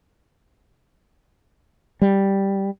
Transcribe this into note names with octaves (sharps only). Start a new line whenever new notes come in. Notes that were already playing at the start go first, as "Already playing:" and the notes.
G3